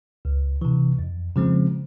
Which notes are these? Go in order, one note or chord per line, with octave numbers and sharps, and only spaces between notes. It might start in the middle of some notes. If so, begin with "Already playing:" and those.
C#2
C3 E3
F2
C#3 F3 G#3 C4